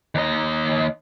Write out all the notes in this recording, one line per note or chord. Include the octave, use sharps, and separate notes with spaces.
D#2 D#5